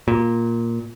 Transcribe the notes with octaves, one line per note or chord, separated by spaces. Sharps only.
A#2